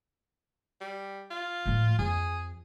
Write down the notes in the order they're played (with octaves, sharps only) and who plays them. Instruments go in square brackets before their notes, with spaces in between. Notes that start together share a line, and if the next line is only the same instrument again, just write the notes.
[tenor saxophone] G3
F4
[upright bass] A2 F3
[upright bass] F2 [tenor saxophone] G#4